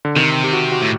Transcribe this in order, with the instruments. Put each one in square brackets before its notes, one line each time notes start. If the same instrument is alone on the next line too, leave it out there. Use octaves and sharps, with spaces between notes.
[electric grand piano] D3
[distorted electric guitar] C3 [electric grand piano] D#3
[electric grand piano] G4
F#4
F#4
[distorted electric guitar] A2